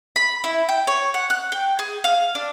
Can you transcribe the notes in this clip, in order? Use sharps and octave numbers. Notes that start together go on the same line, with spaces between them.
B5
E4
G5
C#5
F#5
F#6
G5
G#4
F5
D4